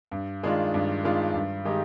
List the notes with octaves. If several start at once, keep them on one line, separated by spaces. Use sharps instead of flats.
G2
D#3 G#3 D4 F4
G2
D#3 G#3 D4 F4
G2
D#3 G#3 D#4 G4